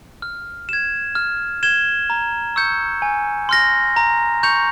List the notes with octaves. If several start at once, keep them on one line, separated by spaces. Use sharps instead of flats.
F6
G#6 E7
F6
G#6 E7 G7
A#5
C#6 E6 G6 C#7
G#5
C6 F6 A#6
A#5
C#6 G6 C#7 F7